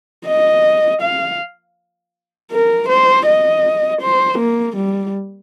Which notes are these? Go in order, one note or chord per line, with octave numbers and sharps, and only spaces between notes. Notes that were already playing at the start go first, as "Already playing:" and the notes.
D#5
F5
A#4
C5
D#5
C5
A#3
G3